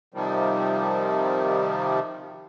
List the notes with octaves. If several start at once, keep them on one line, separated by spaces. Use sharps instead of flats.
C3 D#3 F3 G3